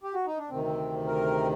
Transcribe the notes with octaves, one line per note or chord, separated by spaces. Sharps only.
G4
F#4
D#4
D4
D2 C3 D#3 C4
C4
A#4